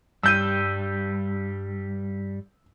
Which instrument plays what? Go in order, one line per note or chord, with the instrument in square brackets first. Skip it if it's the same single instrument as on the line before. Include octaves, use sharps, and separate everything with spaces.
[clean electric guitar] G2 G3 [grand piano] E6 G6 D#7